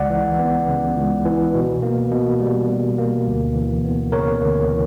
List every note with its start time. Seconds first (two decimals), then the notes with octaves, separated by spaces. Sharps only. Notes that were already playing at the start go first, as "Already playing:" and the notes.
Already playing: C#2 D5 F#5
0.10 E3
0.39 B3
0.68 C#3
0.96 C#2
1.25 E3
1.54 B2
1.82 A#3
2.11 B2
2.40 G3
2.69 B2
2.98 A#3
3.27 D2
3.55 E3
3.85 B3
4.12 C#3 A#4 C#5
4.42 D2
4.70 E3